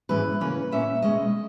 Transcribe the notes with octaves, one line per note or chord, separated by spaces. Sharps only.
G#2 E3 G#3 C#4 B4
C#3 E3 A#3 C#4 B4
A#2 A#3 C#4 E5
B2 G#3 C#4 D#5